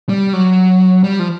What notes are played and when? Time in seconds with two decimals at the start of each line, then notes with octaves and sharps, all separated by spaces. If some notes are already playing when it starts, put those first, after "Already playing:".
0.09 G3
0.33 F#3
1.04 G3
1.19 F3